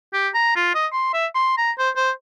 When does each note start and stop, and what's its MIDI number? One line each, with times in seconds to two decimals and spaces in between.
0.13 0.29 67
0.34 0.53 82
0.56 0.70 65
0.75 0.87 75
0.93 1.12 84
1.13 1.27 76
1.35 1.53 84
1.58 1.72 82
1.78 1.90 72
1.96 2.11 72